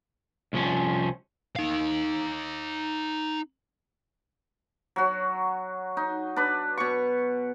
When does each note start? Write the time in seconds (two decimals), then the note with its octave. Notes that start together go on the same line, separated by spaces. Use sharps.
0.53 C2 F3 C#4
1.56 D#4 F5
4.96 F#3 F#4
5.97 D#4
6.36 D4 B4
6.77 B2 C#6